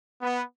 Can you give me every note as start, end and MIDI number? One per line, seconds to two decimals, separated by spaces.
0.22 0.42 59